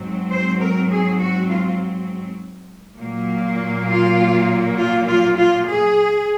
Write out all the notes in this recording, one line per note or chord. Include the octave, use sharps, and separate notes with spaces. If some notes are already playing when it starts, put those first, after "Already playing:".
Already playing: G#2 F#3 C4
C5
A#4
G#4
F#4
F4
A#2 F#3 A#3
F4
F4
F4
F4
G#4